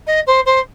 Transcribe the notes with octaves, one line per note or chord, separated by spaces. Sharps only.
D#5
C5
C5